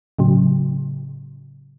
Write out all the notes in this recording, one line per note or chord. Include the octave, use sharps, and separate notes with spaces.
A2 C#3 F#3